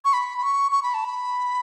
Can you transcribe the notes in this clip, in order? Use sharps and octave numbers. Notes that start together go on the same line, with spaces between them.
C#6
B5
B5
C#6
C#6
B5
A5
B5